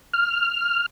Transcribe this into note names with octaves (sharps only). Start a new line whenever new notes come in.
F6